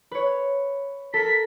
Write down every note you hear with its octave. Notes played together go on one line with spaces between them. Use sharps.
B4 C#5
A4 A#4 B6